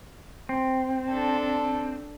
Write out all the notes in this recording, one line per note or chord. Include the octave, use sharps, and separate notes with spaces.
C4
D4 A4